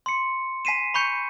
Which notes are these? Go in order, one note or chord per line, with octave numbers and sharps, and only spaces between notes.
C6 C#7
G#5 B6 C7 D#7 E7
B5 C#6 G6 C#7